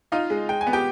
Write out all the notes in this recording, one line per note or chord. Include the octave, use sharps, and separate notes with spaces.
D#4 F4 F5
G#3
G#3 G5
G#5
B3
G4 G5